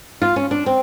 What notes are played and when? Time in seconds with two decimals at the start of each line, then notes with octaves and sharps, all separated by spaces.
0.22 F4
0.36 C#4
0.51 D4
0.66 C4